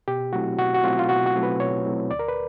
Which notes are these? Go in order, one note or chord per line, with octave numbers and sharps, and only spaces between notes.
B2 G4
F#3 A3 C4 E4 F#4
B2 F#4
F#4
F#3 A3 C4 E4 F4
F4
B2 F#4
F#4
F#3 A3 C4 E4
B4
B2 C#5
F#3 A3 C4 E4
D2 D5
A#4
B4